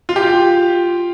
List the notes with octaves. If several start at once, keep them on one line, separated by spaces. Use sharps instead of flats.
F4
G4
F4